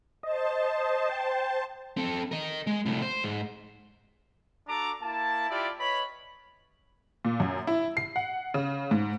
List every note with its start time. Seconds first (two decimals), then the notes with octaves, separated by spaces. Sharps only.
0.23 C5 D#5 A5
1.09 G5
1.97 C4 A4
2.31 A#4 D#5
2.67 G#3
2.86 C2 A2
3.02 C5
3.24 G#2
4.67 D4 F#4 A4 A#5 D6
5.01 A#3 E4 A5
5.49 E4 F4 G4 D5
5.79 B4 C#5 D#5 B5
7.25 A#2
7.40 F#2
7.67 E4
7.97 C7
8.16 F#5
8.54 C#3
8.91 G#2